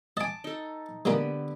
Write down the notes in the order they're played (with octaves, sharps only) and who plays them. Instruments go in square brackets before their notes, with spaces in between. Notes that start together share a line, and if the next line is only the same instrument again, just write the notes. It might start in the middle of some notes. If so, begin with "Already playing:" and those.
[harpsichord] D#5 G#5 [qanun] A5 D6
[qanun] D#4 A4
[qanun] D3 B3 G4 [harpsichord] G#3 A#3